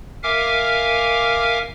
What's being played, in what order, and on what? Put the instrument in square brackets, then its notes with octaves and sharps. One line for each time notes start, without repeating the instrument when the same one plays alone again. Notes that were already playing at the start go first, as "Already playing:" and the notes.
[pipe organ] A#4 E5 F5 G#5 D6 F6